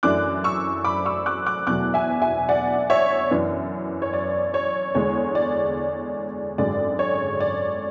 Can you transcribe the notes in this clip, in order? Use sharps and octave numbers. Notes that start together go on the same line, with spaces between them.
F#2 E3 A3 D4 D6 F#6
C#6 E6
B5 D6
C#6 E6
D6 F#6
D6 F#6
E2 B2 F#3 A3 D6 F#6
E5 G#5
E5 G#5
D5 F#5
C#5 E5
F#2 E3 B3 D4
C#5
D5
C#5
E2 D3 G#3 C#5
D5
G#1 F#2 D3 G#3 D5
C#5
D5